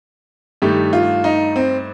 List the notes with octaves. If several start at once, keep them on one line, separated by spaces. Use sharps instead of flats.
G2 D#3 A3 G4
F4
D#4
C4